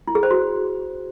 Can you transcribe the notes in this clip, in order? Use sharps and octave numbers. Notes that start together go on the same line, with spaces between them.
E4
G#4
C5
F#4